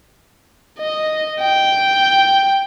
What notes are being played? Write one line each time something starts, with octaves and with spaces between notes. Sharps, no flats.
D#5
G5